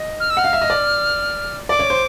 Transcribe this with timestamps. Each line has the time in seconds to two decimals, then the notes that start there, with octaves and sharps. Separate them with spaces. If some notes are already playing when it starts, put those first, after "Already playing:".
Already playing: D#5
0.20 F6
0.30 E6
0.37 F#5 F6
0.44 F5
0.53 E5
0.62 D#5
0.70 D5
1.69 D5 D6
1.79 C#5
1.90 C5